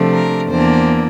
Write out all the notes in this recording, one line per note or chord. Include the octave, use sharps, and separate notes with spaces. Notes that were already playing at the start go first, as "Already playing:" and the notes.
Already playing: C3 F3 A3 D4
A#4
E2 E3 A#3 D4 C5